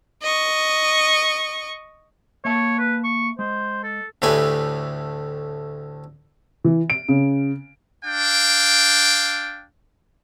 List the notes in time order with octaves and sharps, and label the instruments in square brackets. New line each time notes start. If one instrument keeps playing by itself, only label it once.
[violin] D#5 C#6
[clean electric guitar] A#3 E5 A5 [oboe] C#5
[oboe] B4
C#6
[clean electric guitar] G#3 [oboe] C5
[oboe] A4
[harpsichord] D2 A2 G4 B4 G#5
[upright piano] E3
D7
C#3
[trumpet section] D4 F5 G5